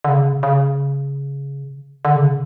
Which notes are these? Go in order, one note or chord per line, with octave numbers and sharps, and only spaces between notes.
D3
C#3
C#3
D3
C#3